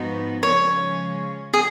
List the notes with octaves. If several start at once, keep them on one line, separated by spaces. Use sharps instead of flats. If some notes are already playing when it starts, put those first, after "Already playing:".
Already playing: G#2 F3 B3 D#4 F#4
C#3 F3 G#3 C#4 C#5
G#4